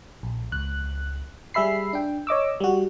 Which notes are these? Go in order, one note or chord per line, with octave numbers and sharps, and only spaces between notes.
A#1
C#2 F#6
G3 G#4 E5 B5 C7
D4 G5
C#5 D#5 D6 E6
G3 F#4